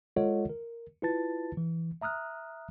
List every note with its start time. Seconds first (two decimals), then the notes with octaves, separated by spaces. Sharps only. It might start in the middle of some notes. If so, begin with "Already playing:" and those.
0.16 G#3 F4 A4 C#5 D#5 F#5
0.49 A#4
1.02 E4 F4 B4 A5 A6
1.57 E3
2.02 E5 A#5 D#6 F6 F#6